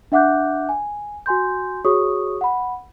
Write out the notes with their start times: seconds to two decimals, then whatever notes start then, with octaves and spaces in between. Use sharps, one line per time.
0.12 D4 E5 F#5 D6 F#6 G6
0.69 G#5
1.26 F#4 G#5 C6 G6
1.85 F#4 G#4 C#5 C#6 D#6
2.41 F#5 B5